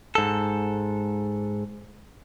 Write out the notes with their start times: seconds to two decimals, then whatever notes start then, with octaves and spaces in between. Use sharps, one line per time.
0.15 G#2 A4